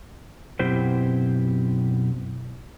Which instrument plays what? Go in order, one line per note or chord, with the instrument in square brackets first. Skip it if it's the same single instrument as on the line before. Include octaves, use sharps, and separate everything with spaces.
[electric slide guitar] F#2 B2 C4 E4 G4 C5